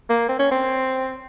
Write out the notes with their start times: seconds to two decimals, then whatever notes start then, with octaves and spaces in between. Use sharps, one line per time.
0.09 A#3
0.29 C4
0.39 C#4
0.51 C4